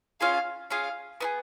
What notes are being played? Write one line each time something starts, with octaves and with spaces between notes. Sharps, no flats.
C#4 F4 G#4 F5
C#4 F4 G#4 F5
B3 D#4 G#4